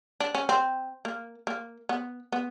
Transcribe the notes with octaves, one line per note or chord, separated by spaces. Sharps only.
D4
C#4
C4
A#3
A#3
B3
B3